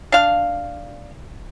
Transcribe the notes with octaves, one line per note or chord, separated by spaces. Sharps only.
D4 F5